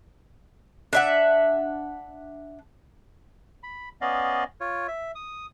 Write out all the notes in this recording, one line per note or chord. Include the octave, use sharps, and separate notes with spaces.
D4 E5 F#5
B5
B3 C#4 D5 D#5 F5
F4 C#5
E5
D#6